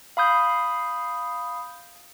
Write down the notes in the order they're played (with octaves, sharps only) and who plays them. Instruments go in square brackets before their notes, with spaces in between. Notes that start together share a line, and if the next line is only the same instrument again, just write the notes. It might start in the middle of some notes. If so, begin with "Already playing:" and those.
[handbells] F5 B5 D#6 G6